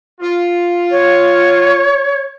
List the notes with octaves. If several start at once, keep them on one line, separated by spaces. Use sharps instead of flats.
F4
C#5